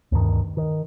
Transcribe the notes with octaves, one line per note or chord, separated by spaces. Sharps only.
D2 G2 D#3
D#3